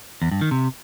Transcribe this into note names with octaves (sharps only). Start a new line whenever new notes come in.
E2
G2
D#3
C3